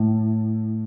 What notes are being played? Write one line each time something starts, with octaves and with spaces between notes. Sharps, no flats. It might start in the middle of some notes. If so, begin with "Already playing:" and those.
Already playing: A2